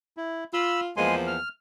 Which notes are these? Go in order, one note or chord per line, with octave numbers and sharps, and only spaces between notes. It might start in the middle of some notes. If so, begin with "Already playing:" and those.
E4
F4 B5 E6
E2 F3 G#3 A#3 G#5 C6
F6